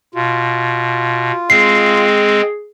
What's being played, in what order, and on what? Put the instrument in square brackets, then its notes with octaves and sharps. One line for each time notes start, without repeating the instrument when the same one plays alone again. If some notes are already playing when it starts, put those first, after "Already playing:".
[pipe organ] B2 [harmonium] F4
[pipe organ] G#3 C4 [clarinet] G#4 [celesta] C7